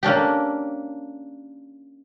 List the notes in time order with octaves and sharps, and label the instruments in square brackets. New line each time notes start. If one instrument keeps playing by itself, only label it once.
[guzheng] A#3 C#4 D4 G4